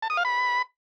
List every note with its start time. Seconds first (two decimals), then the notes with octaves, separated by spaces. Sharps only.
0.02 A5
0.10 D#6
0.17 F5
0.25 B5